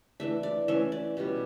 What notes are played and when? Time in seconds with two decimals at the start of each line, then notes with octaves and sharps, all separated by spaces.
0.20 E3 A3 D4 E5
0.43 D5
0.68 E3 A3 C#4 E5
0.92 D5
1.17 B2 G3 C#4